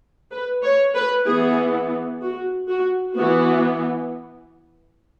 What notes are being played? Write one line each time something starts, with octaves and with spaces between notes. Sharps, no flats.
B4
C#5
B4
E3 B3 G#4
F#4
F#4
E3 B3 F#4